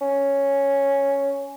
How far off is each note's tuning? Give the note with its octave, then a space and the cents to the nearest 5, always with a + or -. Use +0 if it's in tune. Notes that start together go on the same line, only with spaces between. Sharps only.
C#4 +0